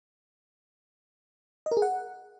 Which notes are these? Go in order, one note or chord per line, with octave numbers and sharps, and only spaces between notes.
D#5
A#4
G#4
F#5